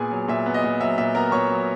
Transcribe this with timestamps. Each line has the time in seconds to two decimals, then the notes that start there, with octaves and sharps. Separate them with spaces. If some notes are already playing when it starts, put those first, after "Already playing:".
Already playing: A#2 B3 G#4 G#5
0.12 F#3
0.28 A#2 E5
0.46 B3
0.54 D#5
0.64 A#2
0.81 F#3 E5
0.98 A#2 E5
1.15 B3 A#4 A#5
1.32 A#2 C#5 C#6
1.50 F#3